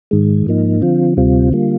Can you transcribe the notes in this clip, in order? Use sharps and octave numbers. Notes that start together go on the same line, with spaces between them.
G#2 D#3 G#3
G#2 F3 A#3 D#4
D3 F3 C4 F4
D2 C3 G3 C4 F4
D3 G3 A#3 F4